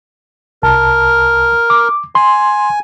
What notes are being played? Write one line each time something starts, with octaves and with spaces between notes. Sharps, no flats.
C2 A#4 A5
D6
G#5 C6